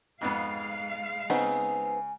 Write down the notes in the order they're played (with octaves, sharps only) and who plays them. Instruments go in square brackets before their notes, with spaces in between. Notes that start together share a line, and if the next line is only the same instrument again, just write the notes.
[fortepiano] F2 G#2 B3 [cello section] G#3 F5
[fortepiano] C#3 [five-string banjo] B3 C4 D#4 [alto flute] G#5